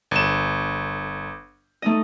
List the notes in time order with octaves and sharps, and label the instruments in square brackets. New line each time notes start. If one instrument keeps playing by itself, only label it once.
[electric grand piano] G1 E7
[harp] A3 D#4 D#5